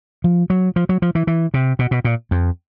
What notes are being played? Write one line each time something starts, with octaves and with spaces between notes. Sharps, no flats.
F3
F#3
F3
F#3
F3
E3
E3
C3
B2
B2
A#2
F2